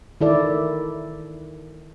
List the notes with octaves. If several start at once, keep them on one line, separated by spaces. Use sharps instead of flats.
D#3 E4 A4 D5